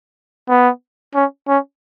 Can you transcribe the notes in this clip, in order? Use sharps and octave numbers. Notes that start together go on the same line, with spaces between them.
B3
C#4
C#4